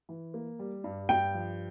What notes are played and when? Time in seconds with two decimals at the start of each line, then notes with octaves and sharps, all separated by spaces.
0.09 E3
0.34 A#3
0.59 G3
0.84 G2
1.09 G2 G5
1.34 F3